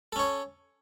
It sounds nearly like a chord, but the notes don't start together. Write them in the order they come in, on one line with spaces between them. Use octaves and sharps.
A4 C#4 C#5